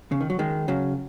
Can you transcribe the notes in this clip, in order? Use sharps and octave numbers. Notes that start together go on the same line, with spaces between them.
C#3
D#3
F#3
D#3 G#3
C#3 F#3